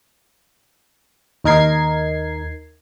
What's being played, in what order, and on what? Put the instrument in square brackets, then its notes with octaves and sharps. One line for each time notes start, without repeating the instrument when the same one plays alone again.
[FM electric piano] D#2 D#4 A#4 G#6 C7